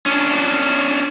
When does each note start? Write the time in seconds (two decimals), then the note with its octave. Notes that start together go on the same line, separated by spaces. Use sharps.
0.06 C#4 D4